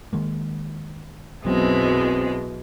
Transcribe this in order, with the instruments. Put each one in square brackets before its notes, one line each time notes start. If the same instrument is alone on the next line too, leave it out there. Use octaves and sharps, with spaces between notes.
[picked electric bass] D#3 G#3 A#3
[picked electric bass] B1 F#3 B3 [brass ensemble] F#2 C4 [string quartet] B2 E3 G#3